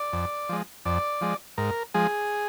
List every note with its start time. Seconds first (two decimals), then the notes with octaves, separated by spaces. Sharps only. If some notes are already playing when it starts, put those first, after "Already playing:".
Already playing: D5
0.13 F2
0.49 F3 G#3
0.86 F2 D5
1.21 F3 G#3
1.58 G#2 A#4
1.94 F3 G#3 G#4